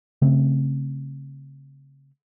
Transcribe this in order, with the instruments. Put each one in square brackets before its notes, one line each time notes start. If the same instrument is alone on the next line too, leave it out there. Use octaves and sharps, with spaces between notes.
[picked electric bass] C#3 A3 C4